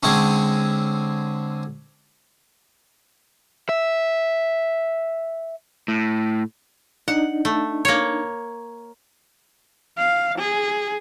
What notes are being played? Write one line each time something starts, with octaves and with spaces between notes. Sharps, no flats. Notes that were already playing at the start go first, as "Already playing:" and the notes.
D3 G#3 C4 C#4
E5
A2
D4 D#4 F#5
A3
A#3 C#5
F5
G#4